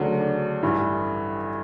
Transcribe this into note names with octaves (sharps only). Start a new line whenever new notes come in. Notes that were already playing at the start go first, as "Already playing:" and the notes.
Already playing: D2 C#3 F#3 D4
D4
A1 G2 E3